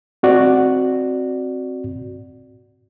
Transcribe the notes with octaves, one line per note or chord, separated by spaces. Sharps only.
C4 F#4 D5